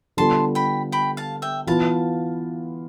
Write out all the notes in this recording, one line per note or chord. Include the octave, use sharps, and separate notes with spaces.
D3 G3 B3 F4 A4 A5 C6
G5 B5
G5 B5
F5 A5
E5 G5
E3 B3 F4 B4 F5 A5